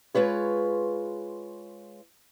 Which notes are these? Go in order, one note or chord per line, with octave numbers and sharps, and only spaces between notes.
G#3 F4 B4 C#5